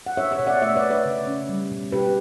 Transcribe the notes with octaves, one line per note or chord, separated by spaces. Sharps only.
F#5
D4 C#5 E5
C#5 E5
B2
D5 F#5
A3 C#5 E5
B4 D5
D4
B4 D5
C#3
C#4
G3
B2
B2 G4 B4